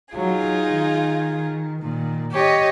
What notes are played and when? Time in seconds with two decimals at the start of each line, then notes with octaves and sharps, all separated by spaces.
0.15 F#3 D#4 F4 G#4
0.67 D#3
1.82 A#2 D#3
2.33 G4 C#5 D#5